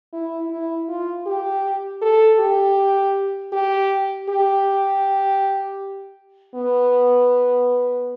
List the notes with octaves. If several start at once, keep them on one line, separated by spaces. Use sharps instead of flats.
E4
E4
F4
G4
A4
G4
G4
G4
B3